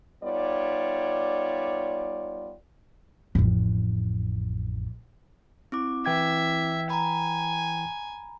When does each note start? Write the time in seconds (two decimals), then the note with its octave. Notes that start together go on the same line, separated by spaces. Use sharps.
0.24 G3 B3 D#4 F4 C#5 D5
3.35 A1 F2
5.72 C4 E4 D6
6.06 E3 E5 G5 G#6
6.90 G#5 A#5 B5